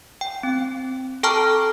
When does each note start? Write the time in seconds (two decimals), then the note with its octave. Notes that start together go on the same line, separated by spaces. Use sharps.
0.21 G5
0.43 C4
1.23 A4 G5 A5 A#5 C#6 F6